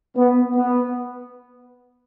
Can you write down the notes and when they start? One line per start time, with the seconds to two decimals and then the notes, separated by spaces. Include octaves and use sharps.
0.17 B3
0.56 B3